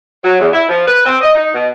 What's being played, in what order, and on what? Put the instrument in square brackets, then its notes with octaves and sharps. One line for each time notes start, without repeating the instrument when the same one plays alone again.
[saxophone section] F#3
E2
E4
F3
B4
C4
D#5
D#4
B2